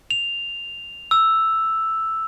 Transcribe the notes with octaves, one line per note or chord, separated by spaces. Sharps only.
F7
E6